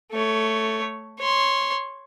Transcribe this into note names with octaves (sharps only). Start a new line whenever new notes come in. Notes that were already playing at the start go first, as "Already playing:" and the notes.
A3 C#5
C#5 C6